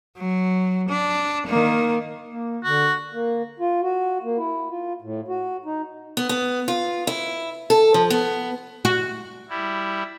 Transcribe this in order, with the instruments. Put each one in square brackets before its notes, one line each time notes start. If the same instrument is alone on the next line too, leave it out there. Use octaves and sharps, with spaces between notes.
[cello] F#3
D4
D#3 A#3
[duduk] A#3
[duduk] D3 [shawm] F#4
[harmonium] A#3
F4
F#4
A#3
E4
F4
A2
F#4
D#4
[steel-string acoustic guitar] B3
B3
F4
E4
A4
F3
B3
[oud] F#4
[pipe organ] G3 E4